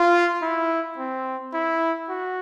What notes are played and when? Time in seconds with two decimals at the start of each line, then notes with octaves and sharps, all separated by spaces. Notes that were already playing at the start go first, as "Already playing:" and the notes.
Already playing: F4
0.42 E4
0.98 C4
1.54 E4
2.09 F#4